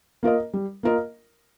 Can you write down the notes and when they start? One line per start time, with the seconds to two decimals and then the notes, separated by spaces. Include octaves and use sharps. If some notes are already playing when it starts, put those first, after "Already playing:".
0.23 A#3 F4 A#4 D#5
0.53 G3
0.83 A#3 F4 A#4 D#5